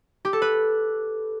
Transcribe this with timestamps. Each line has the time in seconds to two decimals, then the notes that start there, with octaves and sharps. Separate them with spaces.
0.25 G4
0.33 A4
0.42 B4